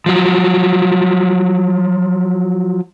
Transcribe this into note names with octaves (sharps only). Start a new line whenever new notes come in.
F3 F#3